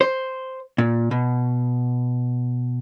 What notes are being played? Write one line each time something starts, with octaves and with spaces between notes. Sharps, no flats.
C5
A#2
B2